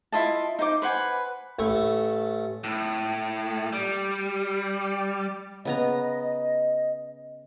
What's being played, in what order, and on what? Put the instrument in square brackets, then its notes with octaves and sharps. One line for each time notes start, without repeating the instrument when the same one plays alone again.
[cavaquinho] E4 F4 D#5 A5
D#4 C5 D6
B4 C5 F#5 G#5
[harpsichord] A1 A3 C#6
[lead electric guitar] A2
G3
[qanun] C#3 B3 A#5 [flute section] D#5